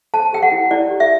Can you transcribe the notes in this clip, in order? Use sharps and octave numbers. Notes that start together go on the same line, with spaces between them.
C5 A5
G4 G5
F#5
E4
E4 D5
G4
E5